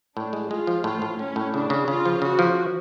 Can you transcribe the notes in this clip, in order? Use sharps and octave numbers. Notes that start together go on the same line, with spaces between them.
A2 D4
G#3
G#3 F4
F3
A2 F4
A2
A2 C#4
A2
C#3 D4
C#3
C#3 F4
F3
C#3 F#4
F3